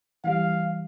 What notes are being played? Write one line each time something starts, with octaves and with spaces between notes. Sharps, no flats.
E3 G3 F5